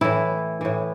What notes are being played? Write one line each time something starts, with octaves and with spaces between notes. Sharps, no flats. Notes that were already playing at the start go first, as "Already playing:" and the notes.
A2 E3 E4
A2 E3